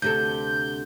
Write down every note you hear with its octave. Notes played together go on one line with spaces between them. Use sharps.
D2 C3 A4 G6